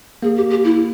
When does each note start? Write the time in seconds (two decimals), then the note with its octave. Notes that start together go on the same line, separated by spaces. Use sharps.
0.23 A#3 G#4
0.36 G4
0.50 G4
0.64 E4